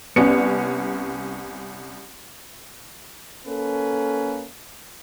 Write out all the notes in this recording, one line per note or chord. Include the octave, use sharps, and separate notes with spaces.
C2 B3 C#4 C#7
A#3 C#4 A4 B4